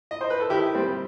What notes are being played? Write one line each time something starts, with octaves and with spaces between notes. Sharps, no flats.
D#5
C5
B4
A4
D#3 E4 G4
G3 C4